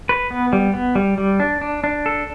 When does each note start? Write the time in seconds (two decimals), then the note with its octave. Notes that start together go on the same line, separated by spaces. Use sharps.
0.09 B4
0.31 B3
0.53 G3
0.74 B3
0.95 G3
1.18 G3
1.40 D4
1.61 D4
1.84 D4
2.06 A4